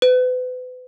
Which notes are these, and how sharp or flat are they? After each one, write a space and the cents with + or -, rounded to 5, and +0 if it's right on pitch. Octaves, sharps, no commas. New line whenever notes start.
B4 +35